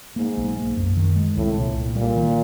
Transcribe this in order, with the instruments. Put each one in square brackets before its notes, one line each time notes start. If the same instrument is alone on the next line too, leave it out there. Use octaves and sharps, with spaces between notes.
[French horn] G#2 [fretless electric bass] A#3
[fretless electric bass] B1
A#3
F#2
D#3
G#3
[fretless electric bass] C2 [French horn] A2
[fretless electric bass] A#2
C2
[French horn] A#2 [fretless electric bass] G3
[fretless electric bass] D#3